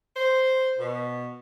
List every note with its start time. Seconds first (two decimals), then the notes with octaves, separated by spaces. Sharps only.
0.16 C5
0.77 B2